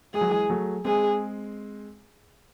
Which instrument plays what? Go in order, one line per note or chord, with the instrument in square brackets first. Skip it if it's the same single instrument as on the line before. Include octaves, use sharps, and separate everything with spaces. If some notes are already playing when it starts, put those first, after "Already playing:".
[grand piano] G#3 [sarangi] G#4
[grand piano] F#3
E3 G#3
F#3 A3
[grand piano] G#3 C4 [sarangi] G#4